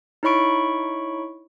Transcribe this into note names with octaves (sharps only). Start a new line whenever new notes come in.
D#4 E4 C#5 B5 C#6 D7